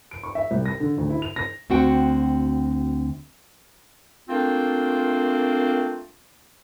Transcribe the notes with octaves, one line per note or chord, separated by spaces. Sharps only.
D7
C#6
E5
C2
A#6
D3
D2
E4
F7
A#6
D2 C4 F#4 F#5 G5
A3 A#3 C4 D4 F4